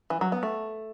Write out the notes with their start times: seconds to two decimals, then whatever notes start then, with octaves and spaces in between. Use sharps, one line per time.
0.10 E3
0.21 F#3
0.32 B3
0.43 A3